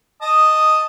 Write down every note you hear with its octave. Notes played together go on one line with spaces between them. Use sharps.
D#5 A5 D#6